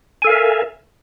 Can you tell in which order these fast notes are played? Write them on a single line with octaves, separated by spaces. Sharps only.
G#5 A4 F5 A#4 E5